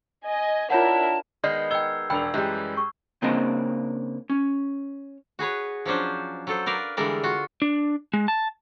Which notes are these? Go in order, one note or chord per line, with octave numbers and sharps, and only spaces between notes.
D#5 G#5
D4 E4 F4 A#4 C#5 F#5 A5
D#3 G#3 B3 D5 D#5 F6 G6 C7
D#5 G5 A#5 E6 G#6 G7
E1 D4 G5 B5 F7
F#2 E3 G3 G#3 G4
C#6
C#3 A#3 C4 D4 D#5
C#4
F#4 G#4 B4 C#5
F3 F#3 C#4 D4 C5
F#3 A4 C5
A#4 B4 D5 F5
D3 E3 G3 G#3 A#4 D5
F4 F#4
D4
G#3
A5